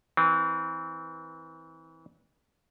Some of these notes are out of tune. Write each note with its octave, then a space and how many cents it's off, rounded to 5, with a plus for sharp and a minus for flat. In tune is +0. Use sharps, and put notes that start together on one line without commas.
E3 -30 C4 -20